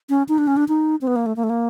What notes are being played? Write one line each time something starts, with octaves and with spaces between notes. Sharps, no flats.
C#4
D#4
D4
C#4
D4
D#4
C4
B3
A#3
A3
A#3
A3
A#3